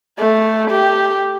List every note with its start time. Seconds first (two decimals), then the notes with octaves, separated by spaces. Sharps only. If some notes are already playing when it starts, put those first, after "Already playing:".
0.19 A3
0.70 G4